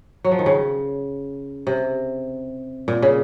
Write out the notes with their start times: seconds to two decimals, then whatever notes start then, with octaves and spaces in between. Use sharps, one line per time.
0.24 F#3
0.31 F3
0.39 D#3
0.46 C#3
1.67 C3
2.88 A#2
3.02 C#3